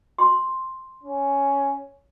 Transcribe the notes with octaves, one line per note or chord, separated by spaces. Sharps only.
C6
C#4